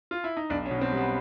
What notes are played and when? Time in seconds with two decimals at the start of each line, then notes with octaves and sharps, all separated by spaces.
0.11 F4
0.24 E4
0.37 D#4
0.50 B1 D4
0.65 C#4
0.71 B2
0.81 C4
0.92 G3 B3